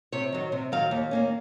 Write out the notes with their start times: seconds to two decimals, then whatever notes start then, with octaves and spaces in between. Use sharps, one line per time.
0.12 C3 C#5
0.32 D#3 F#3
0.52 C3
0.72 D#3 F#3 F5
0.91 D#2
1.11 D#3 A#3 C#4